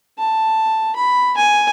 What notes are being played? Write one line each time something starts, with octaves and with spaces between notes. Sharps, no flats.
A5
B5
G#5